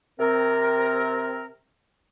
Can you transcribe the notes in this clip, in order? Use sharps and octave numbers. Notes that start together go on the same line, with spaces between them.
C3 C4 A#4